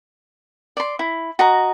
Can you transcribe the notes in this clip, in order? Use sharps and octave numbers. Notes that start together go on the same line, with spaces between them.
D5 C6
E4
F#4 D#5 A#5